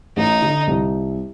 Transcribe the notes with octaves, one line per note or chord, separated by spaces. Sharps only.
A1 D#4
D3
C2